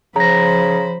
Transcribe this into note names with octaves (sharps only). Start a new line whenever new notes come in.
C#3 F3 C5 A#5 B5 A#6